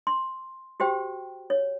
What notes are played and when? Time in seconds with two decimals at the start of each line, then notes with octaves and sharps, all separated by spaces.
0.07 C6
0.80 F#4 G4 C5 G5
1.50 C#5